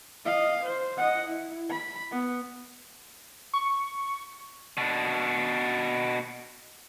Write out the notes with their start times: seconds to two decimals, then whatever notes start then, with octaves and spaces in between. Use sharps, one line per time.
0.25 D#5 F5
0.63 C5
0.97 D#5 F#5
1.27 E4
1.70 B5
2.11 B3
3.53 C#6
4.78 B2 D4